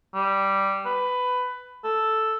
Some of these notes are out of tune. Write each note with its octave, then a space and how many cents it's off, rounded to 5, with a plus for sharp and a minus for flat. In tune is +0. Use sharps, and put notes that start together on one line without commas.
G3 -5
B4 +15
A4 +0